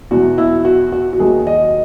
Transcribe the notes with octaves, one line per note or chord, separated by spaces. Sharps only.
E2 B2 F#3 F#4
E4
F#4
F#4
F#4
D#2 D#3 F#3 G#4
D#5